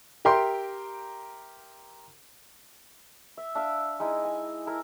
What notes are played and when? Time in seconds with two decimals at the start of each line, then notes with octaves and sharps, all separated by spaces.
0.25 G4 A#4 E5 G5 C6
3.37 E5
3.55 D4 E5 F5
4.00 G#3 D#4 E4
4.25 G#5
4.67 E4 A4 A#4